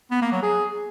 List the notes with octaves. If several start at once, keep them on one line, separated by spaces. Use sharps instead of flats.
B3
A#3
F#3
G#4